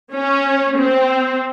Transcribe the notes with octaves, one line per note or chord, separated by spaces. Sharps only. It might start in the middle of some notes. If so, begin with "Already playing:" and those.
C#4
C4